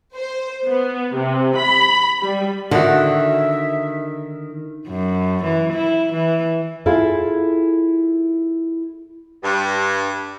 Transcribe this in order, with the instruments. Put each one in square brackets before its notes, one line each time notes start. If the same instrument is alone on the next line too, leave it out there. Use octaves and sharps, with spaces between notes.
[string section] C5
B3
C3
B5
G3
[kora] D3 F#4 [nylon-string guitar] D#3 [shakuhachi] E5
[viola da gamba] F#2
E3
E4
E3
[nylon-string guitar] E4 F4 G#4 A4 E5
[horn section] G2